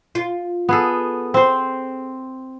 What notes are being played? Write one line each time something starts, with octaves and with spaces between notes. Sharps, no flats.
F4
B3 G#4 A4
C4 C5